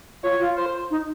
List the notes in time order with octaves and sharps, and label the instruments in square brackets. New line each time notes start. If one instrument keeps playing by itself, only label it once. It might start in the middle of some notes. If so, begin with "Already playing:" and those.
[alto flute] F4 [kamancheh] C#5
[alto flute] F4
[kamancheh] C5
[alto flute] D#4